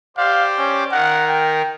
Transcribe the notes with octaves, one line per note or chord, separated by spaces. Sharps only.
G4 C5 D5 F5
C#4
D#3 A#4 F#5
G5